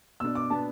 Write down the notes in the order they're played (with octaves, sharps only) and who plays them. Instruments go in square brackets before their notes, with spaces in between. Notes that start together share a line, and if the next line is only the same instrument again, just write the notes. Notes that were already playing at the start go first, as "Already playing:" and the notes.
[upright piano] B2 B3 D4 [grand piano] E6
[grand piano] D6
[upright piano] B2 B3 D4 [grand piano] A5